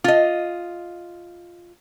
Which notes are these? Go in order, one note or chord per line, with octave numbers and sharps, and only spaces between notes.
F4 D#5